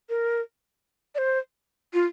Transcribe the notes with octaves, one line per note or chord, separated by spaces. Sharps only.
A#4
D5
C5
F4